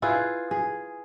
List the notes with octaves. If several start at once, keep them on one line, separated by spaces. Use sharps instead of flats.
E4 F4 G#4 B4
G#4